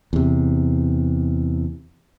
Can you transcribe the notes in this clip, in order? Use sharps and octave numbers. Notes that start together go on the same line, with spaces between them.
E2 C3